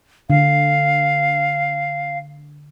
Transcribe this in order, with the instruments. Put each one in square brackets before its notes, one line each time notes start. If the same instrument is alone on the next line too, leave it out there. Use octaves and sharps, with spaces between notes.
[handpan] D3 [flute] F5